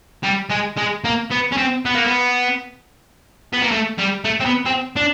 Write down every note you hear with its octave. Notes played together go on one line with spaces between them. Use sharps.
G3
G#3
G#3
A#3
B3
C#4
C4
B3
A#3
B3
B3
A#3
A3
G3
A3
C4
B3
C4
D4